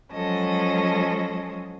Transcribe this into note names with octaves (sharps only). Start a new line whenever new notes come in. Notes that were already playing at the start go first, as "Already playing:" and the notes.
F3 F#3 G#3 C#4 A4 D#5